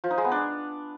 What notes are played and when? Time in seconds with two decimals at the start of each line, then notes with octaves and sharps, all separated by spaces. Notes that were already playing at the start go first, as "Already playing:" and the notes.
0.04 F3
0.11 D#4
0.18 G#3
0.25 B3
0.31 D4